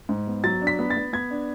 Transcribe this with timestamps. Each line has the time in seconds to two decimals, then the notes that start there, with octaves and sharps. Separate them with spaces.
0.09 G#2
0.27 B3
0.44 F#3 A6
0.62 D4
0.67 B6
0.79 B3
0.90 A6
0.96 B3
1.13 B3 G#6
1.31 D4